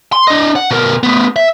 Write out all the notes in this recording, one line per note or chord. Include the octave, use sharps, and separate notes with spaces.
C6
D4 D#5
F#5
B2 A#4
A3 B3
E5